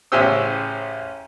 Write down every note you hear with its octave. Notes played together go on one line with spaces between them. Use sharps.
A1 C#3 C#4 G4 C5 E6